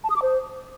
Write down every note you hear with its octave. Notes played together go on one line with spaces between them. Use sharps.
A5
D#6
D6
C5